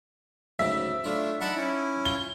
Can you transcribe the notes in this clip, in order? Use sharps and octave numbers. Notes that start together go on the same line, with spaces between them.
D2 G#2 C#3 E5
A3 D4 E4 F4 C#5
D#4 A#4 D5 F#5 A5 B5
C#4 E4
F4 G7